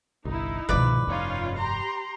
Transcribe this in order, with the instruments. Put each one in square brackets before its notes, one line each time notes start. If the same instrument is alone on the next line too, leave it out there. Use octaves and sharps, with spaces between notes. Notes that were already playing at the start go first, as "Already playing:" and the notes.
[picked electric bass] G1 C2 [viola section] D#4 E4
[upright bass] C2 B2 [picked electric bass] G#2 D#3 F3 [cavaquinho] B4 D5 D6
[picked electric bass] F1 [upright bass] G2 [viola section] C#4 D#4 F4
[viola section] G4 A#5 C6